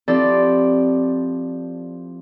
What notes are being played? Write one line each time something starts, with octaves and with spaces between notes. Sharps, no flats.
F3 C4 E4 G4 A4 D5